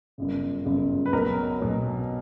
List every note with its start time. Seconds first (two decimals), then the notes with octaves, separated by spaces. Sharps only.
0.18 G1 F#2 C#3
0.65 G1 F#2 C#3
1.06 B4
1.13 B1 B2 F#3 A#4
1.60 B1 B2 F#3